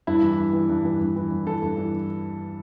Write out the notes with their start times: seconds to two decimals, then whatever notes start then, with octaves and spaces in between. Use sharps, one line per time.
0.07 G2 E4
0.23 E3
0.38 G2
0.53 E3
0.69 G2
0.85 E3
1.00 G2
1.16 E3
1.31 G2
1.47 E3 A4
1.63 G2
1.78 E3